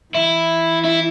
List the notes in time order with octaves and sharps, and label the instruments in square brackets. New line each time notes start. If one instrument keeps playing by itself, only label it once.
[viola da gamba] E3 [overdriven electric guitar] E4
[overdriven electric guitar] E4